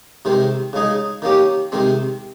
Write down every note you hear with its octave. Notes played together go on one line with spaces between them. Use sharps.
C3 D#3 G#3 C4
C#3 G#3 D#4 G#4
D#3 A#3 C#4 G4
C3 D#3 G#3 C4